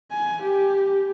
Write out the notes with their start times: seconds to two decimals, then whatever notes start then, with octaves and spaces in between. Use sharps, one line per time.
0.11 G#5
0.43 G4